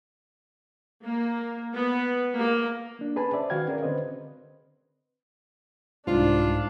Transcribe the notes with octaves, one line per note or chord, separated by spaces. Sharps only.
A#3
B3
A#3
A#3 D4
C#4 G#4 B4 G#5 A5 B5
C5 D5 E5
D#3 F#4 B4 F5 G5 G#6
C#4 G#4 A#4 D5
D3 C4 B4 C5 D#5
C2 G#2 D4 F4